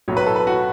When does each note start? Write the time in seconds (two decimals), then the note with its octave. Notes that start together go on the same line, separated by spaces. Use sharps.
0.08 B1 A2 F#3 C#5
0.17 B4
0.26 A4
0.36 B4
0.47 F#4